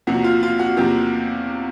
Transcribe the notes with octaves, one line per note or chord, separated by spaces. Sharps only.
E2 C3 F3 A#3 F#4
F4
F4
F#4
E2 C3 F3 A#3 G4